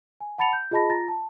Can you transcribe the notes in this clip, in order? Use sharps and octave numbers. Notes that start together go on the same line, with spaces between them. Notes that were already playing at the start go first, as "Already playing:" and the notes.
G#5
F#5 A5 B5 A6 C#7 F7
G6
F4 G#4 D#5 A5 B5 A#6
F4 A#5 A6 A#6
A5